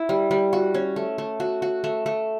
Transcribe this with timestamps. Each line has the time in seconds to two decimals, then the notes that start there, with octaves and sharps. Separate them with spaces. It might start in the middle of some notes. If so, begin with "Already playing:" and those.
Already playing: E4
0.09 G3
0.31 G3
0.53 F#4
0.74 C#4
0.96 A3
1.18 A3
1.40 F#4
1.62 F#4
1.84 A3
2.06 A3